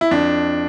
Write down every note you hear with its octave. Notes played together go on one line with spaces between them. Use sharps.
E4
F2 D4